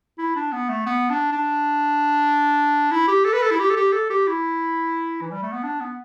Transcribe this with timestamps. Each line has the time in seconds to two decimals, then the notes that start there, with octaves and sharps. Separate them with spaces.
0.18 E4
0.36 D4
0.52 B3
0.69 A3
0.86 B3
1.10 D4
1.32 D4
2.91 E4
3.08 G4
3.25 A4
3.33 B4
3.42 A4
3.51 E4
3.60 G4
3.70 A4
3.76 G4
3.93 A4
4.10 G4
4.28 E4
5.21 E3
5.32 G3
5.43 A3
5.52 B3
5.63 D4
5.80 B3